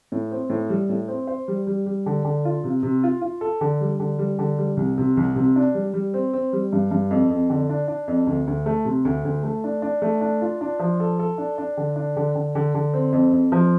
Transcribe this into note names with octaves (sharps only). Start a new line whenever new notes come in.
A2
C4
A2
G3
A2
C4
C5
G3
G3
G3
D3
D3
F4
C3
C3
F4
F4
A4
D3
G3
D3
G3
D3
G3
C2
C3
C2
C3
D4
G3
G3
C4
C4
G3
G2
G2
F2
F2
D3
D4
D4
F2
D2
D2
A3
C3
D2
D2
A3
D4
D4
A3
D4
F4
D4
F3
A4
A4
D4
D4
D3
D4
D3
D3
D3
D3
C4
F2
F2
F3